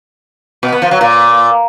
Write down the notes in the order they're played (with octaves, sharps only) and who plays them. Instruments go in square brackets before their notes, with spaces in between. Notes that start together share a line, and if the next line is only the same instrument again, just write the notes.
[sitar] B2
B3
F3
F#3
A#2